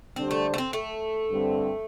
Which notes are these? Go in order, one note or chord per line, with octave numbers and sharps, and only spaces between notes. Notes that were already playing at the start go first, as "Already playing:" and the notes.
D3 G3 C4 D4 G4 C5
A3
A3
C4
A3
G2 D3 G3 C4